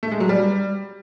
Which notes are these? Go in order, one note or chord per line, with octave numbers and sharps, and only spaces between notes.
A3
G#3
F#3
G3